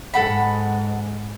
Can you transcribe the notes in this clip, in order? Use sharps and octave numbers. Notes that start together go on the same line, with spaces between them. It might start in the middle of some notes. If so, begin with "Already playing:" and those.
G#2 A4 F#5 B5